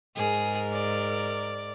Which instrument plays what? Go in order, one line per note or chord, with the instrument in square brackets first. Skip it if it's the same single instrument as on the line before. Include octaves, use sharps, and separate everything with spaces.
[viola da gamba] G#2 A#4 [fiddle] G#4
[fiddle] D5